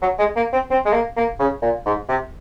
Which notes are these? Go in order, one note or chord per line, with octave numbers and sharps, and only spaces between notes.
F#3
G#3
A#3
C4
C4
G#3
A#3
A#3
C#3
A#2
G#2
C3